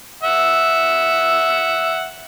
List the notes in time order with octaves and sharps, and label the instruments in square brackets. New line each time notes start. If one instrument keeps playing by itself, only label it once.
[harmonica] E5 F#5